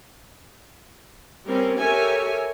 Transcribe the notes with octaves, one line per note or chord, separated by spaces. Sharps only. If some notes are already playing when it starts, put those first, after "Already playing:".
G3 C4 C#4 A#4
G4 A4 A#4 C#5 E5 G#5